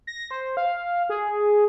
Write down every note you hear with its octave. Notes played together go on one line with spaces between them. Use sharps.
A#6
C5
F5
G#4